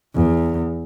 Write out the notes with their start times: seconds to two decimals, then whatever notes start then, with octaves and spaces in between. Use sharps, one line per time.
0.15 E2